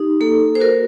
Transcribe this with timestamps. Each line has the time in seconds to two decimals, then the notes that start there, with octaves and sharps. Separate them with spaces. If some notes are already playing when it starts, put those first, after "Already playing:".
Already playing: D#4 G4
0.21 A#3 A4
0.55 C5
0.60 F#4 A#4